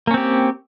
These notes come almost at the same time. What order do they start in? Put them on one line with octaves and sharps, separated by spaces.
A#3 C#4 C4 G4